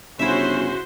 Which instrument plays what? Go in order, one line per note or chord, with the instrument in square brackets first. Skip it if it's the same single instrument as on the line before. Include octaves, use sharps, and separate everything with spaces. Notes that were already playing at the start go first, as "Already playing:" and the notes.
[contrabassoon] G1 [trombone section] C#3 C#4 [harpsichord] E4 E5 [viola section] F#4 C5